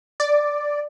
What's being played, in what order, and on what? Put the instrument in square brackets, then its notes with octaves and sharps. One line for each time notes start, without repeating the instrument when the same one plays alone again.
[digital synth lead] D5